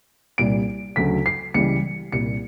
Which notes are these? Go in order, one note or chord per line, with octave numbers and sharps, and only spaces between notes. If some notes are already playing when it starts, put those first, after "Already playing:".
C2 A#2 G3 D7
D2 C#3 F#3 B6
C7
C#2 C#3 E3 G3 C#7
C2 A#2 G3 C#7